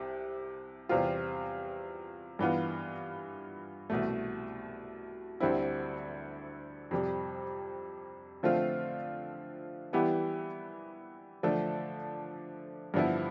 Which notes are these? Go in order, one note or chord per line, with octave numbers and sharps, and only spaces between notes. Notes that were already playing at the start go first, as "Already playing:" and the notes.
Already playing: C2 C3
E2 C3 G3 C4 F4
G2 E3 B3 F4
C2 B2 A3
D2 D3 G3 C4 E4
F2 C3 G3
D3 F3 A3 C4 F4
E3 G3 B3 E4 G4
D3 F3 A3 D4 A4
G2 D3 F3 B3 E4